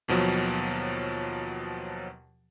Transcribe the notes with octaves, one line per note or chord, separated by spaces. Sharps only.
D#2 B2 F3 F#3